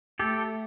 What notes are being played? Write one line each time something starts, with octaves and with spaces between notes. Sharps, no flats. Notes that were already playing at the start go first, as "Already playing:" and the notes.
A3 G4 A4